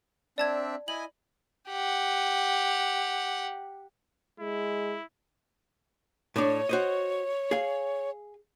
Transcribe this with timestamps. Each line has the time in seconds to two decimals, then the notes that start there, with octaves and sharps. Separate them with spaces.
0.38 C4 D4 D5 E5 A5 G#6
0.88 E4 D#5 G#5 F#7
1.70 G4 F#5
4.40 G#3 E4
6.36 A2 D4 C#5
6.69 F#4 C5 D#5
7.51 G#4 F5